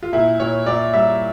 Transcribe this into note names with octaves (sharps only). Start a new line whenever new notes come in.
F4
A#2 E4
A#2 C#5
A#2 D5
G3 E5